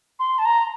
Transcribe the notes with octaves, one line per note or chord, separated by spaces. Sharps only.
C6
A5
A#5